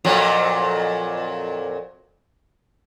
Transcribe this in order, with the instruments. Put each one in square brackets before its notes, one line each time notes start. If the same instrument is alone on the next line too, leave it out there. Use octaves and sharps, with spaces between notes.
[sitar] F2 A#2 F#3